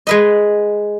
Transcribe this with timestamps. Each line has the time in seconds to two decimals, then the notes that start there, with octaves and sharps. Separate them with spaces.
0.07 G#3 B4 D#5